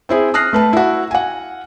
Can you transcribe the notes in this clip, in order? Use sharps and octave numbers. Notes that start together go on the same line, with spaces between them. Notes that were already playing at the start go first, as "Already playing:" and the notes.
C4 E4 G#4
D#6 F6 F#6 A#6 C7
A3 B4 A5
E4 F#4
F#5 G#5